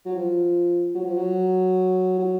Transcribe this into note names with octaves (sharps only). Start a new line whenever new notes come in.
F#3
F3
F#3
F3
F#3
F#3